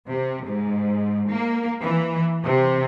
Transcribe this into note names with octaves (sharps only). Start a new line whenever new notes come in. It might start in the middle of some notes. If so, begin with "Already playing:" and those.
C3
G#2
A#3
E3
C3